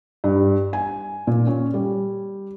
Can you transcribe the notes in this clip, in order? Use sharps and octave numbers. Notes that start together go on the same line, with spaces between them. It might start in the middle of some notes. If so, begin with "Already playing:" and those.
G2
G#5
A#2
C#4
G3